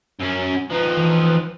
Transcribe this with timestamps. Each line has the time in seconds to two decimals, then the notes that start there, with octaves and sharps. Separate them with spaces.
0.20 F#2 C#4
0.70 F3 D#4 B4
0.97 E3